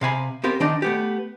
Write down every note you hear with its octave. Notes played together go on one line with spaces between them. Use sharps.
C3 F5 G#5 B5
B3 C4 G4 A#4 F5
D#3 D4 D#4
A3 B3 G4